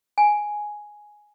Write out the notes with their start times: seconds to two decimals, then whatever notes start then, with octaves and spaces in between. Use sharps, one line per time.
0.18 G#5